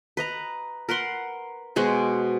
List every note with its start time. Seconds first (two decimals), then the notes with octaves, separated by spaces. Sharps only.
0.17 B4 D#5 A#5
0.89 A#4 B4 F#5 C6
1.76 B2 G#3 F#4 C5